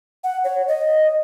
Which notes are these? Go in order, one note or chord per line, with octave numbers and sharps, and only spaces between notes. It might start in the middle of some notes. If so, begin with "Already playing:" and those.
F#5
C#5
D#5